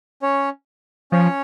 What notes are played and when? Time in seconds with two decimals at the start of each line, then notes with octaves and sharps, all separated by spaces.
0.22 C#4 C#5
1.12 F3 C#4 C#5